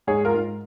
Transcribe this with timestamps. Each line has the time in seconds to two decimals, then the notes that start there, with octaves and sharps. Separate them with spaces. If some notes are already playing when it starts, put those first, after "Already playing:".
0.07 G#2 G#4 C#5
0.25 F4 A#4
0.34 G#2